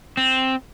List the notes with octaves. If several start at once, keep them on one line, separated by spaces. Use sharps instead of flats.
C4